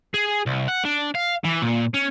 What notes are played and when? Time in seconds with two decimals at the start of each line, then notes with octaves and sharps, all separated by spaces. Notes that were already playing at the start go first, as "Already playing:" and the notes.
0.14 G#4
0.46 C2
0.68 F#5
0.85 D4
1.15 F5
1.44 E3
1.62 A#2
1.94 C#4